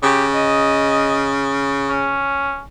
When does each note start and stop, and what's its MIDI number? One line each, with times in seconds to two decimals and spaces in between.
0.03 2.26 49
0.03 0.25 67
0.34 1.33 75
1.89 2.61 61